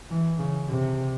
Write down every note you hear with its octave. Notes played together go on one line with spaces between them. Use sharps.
E3
C#3
C3